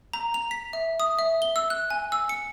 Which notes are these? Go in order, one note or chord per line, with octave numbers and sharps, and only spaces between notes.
A#5
F7
B6
E5
D#6
E5
G7
E6
F#6
G#5
E6
C#7